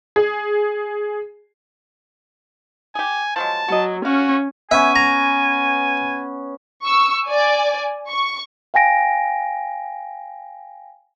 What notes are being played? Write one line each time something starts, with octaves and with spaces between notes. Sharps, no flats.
G#4
G4 G#4 G#5
F3 F#3 G#3 A5
F#3 F#4 D#5
C#4 F#4 F5
B3 C#4 E5 G#5
A#5
C#6 E6
D5 G#5
C#6
F5 G5 G#5 A#6 D7